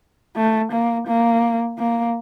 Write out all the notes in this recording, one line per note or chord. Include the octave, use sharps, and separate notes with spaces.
A3
A#3
A#3
A#3